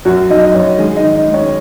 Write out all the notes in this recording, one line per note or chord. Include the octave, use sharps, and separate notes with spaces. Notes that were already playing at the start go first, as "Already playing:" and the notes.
F#2 F#3 F#4
F#2 D#4 D#5
D#5
F#2 C#4 C#5
D#3 G#3 G#4
D#4 D#5
D#3
D#4 D#5
G#3
C#4 C#5